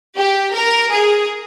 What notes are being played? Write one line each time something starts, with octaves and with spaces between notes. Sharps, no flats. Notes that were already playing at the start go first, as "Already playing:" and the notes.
G4
A#4
G#4